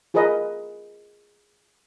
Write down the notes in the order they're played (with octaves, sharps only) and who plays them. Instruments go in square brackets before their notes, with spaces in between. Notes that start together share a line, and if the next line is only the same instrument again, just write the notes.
[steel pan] F4 G#4 A#4 B4 D#5